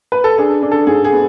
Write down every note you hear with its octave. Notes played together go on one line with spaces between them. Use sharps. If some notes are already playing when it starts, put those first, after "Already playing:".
B4
A4
D4 G#4
D4
A4
G#2 G#4
G#4
B3